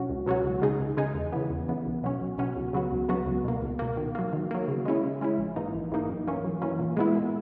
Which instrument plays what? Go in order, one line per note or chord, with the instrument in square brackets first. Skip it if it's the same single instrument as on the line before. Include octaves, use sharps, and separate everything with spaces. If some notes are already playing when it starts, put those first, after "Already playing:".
Already playing: [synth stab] B2 F#3 C#4 F#4
C#2
B2 F#3 C#4 F#4
C#2
C#3 G#3 D#4 G#4
C#2
C#3 G#3 D#4 G#4
E2
C#3 E3 B3
E2
C#3 E3 B3
B1
B2 F#3 C#4
B1
B2 F#3 C#4
C#2
C#3 F#3 B3 F#4
C#2
C#3 F#3 B3 F#4
C#2
B2 A#3
C#2
B2 A#3
D#3
F#3 A#3
D#3
F#3 A#3
C#3
G#3 C#4 E4
C#3
G#3 C#4 E4
A#1
G#2 E3 A#3 D#4
A#1
G#2 E3 A#3 D#4
F#2
E3 A#3 C#4
F#2
E3 A#3 C#4
A#2
G#3 B3 E4
A#2